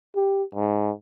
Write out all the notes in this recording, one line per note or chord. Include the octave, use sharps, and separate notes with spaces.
G4
G#2